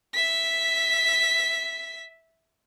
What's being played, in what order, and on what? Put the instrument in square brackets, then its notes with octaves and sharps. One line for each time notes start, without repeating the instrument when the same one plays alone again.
[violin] E5 B6